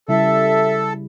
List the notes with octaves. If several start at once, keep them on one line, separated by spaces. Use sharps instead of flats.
C#3 G3 E4 A4 E5